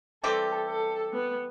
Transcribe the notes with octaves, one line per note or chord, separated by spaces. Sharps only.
E3 G3 C4 G4 A4
A4
B3